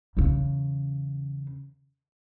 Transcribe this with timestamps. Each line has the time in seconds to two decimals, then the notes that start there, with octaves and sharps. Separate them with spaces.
0.17 E2 C#3